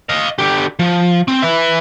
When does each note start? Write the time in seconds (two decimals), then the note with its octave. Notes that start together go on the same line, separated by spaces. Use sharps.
0.09 D#5 F5
0.39 D3 G4
0.79 F3
1.28 C4
1.42 B4 E5